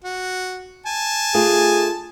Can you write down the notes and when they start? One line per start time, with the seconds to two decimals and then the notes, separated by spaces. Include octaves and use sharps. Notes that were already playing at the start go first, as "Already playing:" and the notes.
0.04 F#4
0.86 G#5 A5
1.34 A3 D4 F4 G#4